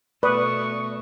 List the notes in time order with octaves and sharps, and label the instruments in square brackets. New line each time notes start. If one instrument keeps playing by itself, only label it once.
[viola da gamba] B2 A3 A4 [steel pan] B4 [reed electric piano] D5 D#6 [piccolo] C#6